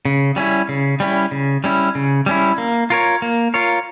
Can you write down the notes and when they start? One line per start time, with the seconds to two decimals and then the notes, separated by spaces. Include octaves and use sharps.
0.05 C#3
0.36 G3 C#4 E4
0.69 C#3
1.00 G3 C#4 E4
1.31 C#3
1.64 G3 C#4 E4
1.95 C#3
2.26 G3 C#4 E4
2.58 A#3
2.90 F4 A#4 C#5
3.22 A#3
3.54 F4 A#4 C#5